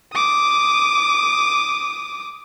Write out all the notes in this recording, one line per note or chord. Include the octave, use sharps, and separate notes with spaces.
D6 D#6